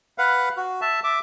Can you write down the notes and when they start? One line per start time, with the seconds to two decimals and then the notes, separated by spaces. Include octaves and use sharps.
0.18 B4 F5 F#5
0.57 F#4
0.81 E5 A5
1.04 E5 D6